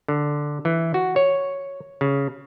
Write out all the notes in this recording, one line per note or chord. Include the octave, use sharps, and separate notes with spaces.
D3
E3
F#4
C#5
C#3